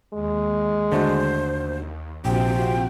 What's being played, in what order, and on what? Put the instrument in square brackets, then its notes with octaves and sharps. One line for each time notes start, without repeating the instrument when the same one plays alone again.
[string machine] D#2 [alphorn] G#3
[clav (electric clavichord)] D3 A3 F#4 [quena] C5
[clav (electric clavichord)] A#1 [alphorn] C3 [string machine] C4 F4 F#4 [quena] G5